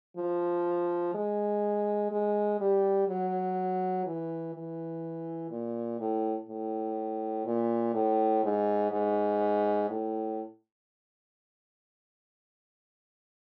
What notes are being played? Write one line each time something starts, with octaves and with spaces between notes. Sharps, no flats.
F3
G#3
G#3
G3
F#3
E3
E3
A#2
A2
A2
A#2
A2
G#2
G#2
A2